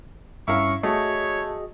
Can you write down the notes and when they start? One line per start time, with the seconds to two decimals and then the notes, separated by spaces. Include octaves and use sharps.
0.48 G2 C#4 E4 A#4 F5 C#6
0.83 A3 F#4 G#4 C#5 D#5